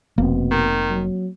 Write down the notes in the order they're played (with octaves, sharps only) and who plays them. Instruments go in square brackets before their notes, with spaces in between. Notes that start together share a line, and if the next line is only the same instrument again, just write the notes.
[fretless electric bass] F1 [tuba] B2 [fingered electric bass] A#3 C4
[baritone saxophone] D#3
[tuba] F#3